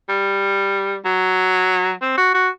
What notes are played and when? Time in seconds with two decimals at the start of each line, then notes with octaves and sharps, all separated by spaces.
0.09 G3
1.05 F#3
2.02 C4
2.18 F#4
2.34 F#4